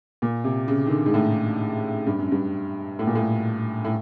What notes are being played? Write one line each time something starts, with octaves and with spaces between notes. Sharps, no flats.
A#2
C3
C#3
D#3
D3
G#2
A2
G2
F#2
G2
A2
A#2
A2
A2